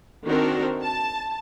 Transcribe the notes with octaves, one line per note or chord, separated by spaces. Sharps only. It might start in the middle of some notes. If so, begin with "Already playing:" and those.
D#3 C4 D4 F#4 A#4
A5